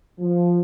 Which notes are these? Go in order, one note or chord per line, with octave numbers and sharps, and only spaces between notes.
F3